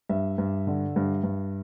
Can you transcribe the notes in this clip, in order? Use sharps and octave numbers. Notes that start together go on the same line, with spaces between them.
G2 E5
G2
D3
G2
G2